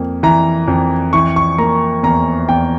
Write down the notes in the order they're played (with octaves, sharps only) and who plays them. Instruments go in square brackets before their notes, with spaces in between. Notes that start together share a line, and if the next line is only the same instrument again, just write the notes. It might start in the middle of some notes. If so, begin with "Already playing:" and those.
Already playing: [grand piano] F2 A#3
E3 A#5
F2
E3 C#6
C#6
A#3 A#5
E2 A#5
E2 G5